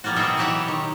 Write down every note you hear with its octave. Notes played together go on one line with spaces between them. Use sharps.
F3 G3 A#3 F4 F#4
B2 C4 D#4 G#4 E5 G5
E3 F#3 G4 C#5 E5 F#5
D#3